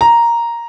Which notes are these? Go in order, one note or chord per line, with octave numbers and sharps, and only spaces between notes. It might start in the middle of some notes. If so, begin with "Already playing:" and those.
A#5